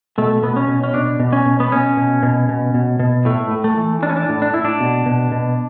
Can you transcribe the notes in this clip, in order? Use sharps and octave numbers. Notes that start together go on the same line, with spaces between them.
B2 A3
B2 B3
C#4
B2
C#4
B2 D4
B2
C#4
B2
B3
B2 C#4
B2
B2
B2
B2
B2
A2 A3
A2
A3
E3
E3 D4
C#4
D4
A2
D4
A2 E4
D4
B2
B2
B2